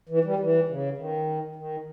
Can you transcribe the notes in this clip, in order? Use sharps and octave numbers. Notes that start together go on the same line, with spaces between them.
E3
G3
E3
C#3
D#3
D#3